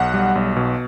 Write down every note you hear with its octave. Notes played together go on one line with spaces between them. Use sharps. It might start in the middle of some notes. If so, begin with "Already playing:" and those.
Already playing: B1 F#5
G3
B1
B2